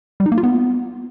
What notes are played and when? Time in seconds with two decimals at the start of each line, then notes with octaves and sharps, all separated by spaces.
0.20 G3
0.26 D#4
0.32 A#3
0.38 F4
0.43 B3